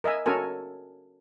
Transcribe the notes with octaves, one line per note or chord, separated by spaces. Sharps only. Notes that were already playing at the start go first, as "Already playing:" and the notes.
A#4 D#5 E5 G#5
C#4 F#4 A4 A#4 G#5